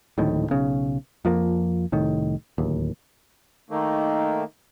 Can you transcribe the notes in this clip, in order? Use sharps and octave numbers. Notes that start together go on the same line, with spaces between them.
D1 A#1 A2 D#3
B1 C#3
F2 F3 A#3
C2 A2 D#3
D1 D#2
D#3 A3 A#3 D#4